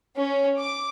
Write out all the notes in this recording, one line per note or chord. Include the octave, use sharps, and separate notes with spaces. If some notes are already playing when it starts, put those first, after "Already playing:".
C#4
D6